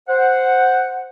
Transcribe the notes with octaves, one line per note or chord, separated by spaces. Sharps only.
C5 F#5